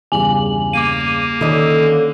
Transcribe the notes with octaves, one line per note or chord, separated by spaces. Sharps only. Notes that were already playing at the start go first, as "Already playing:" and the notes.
E2 G2 C#3 G#5 F#7
A#3 D6 D#7
D3 D#3 C#4 D#5 D#6